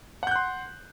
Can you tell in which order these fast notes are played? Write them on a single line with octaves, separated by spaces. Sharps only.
F#5 G6 F#6 C6